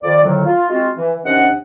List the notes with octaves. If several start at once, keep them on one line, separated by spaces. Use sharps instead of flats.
F2 D#3 D5
F2 A2 D3 D#3 F#3
F4
G#3 C4 F4 F#4
E3
D#2 C3 C#4 D4 D#5 F#5